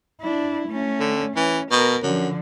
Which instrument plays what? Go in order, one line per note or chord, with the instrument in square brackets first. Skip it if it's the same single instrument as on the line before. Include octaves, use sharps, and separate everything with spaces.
[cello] D4 E4
A3 C#4
[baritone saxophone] D3
[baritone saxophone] E3 [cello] C#4
[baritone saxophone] B2 [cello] A#4
[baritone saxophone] F#2 [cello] D3 F3